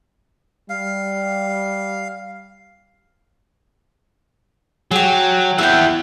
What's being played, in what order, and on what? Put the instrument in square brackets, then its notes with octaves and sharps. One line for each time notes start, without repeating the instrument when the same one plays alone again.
[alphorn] G3 [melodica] F5
[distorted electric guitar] F#3 [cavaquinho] G4 G#4
[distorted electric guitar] E4 F#5 [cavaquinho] E5 G5